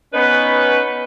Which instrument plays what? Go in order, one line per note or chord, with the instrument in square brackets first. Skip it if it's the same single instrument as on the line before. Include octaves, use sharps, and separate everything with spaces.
[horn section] B3 C#4 D#4 B4